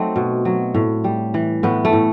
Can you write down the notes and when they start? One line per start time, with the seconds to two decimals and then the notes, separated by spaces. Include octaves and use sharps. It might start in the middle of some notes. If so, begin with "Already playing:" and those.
Already playing: F#3 A3 C4 D#4
0.16 B2
0.45 F#3
0.74 A2
1.04 G3
1.34 E3
1.63 A2 B3
1.85 A3
1.93 A2